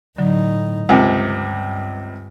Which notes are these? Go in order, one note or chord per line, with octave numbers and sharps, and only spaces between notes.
A2 D3 F#3 D#4
C#2 G2 C3 A#4 G5 G#5